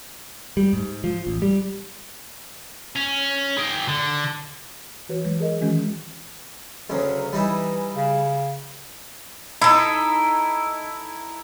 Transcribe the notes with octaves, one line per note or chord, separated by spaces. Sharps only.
G3
G#2
F3
A1
G3
C#4
G#4 G5
D3
E3 F#4 B4 C#5
E3 F#3 G#3
G#4 A#4 D#5
D#3 E3 G#3 C#4 F#4
D2 C#3 F#3
E3 G3 D#4 E4
C#3
D#4 E4 A4